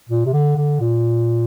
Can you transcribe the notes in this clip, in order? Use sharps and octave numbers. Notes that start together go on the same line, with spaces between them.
A#2
C3
D3
D3
A#2